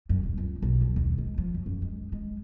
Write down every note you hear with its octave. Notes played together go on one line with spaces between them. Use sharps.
F#2
D#1
C#2
B1
F2
D#2
G#3
F3
F#2
F#2
G#3
G#3